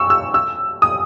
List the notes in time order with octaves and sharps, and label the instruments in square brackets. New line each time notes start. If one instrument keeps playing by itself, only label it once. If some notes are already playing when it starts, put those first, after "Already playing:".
Already playing: [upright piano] C#6 E6
E6
E6
D#6